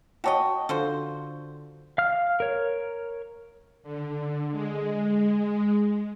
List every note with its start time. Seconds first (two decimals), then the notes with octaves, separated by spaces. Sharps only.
0.24 F#4 C#5 D#5 G5 A5 C#6
0.69 D3 F3 F#4 C5
1.98 F5 F6
2.40 A#4 C#5
3.83 D3
4.51 G#3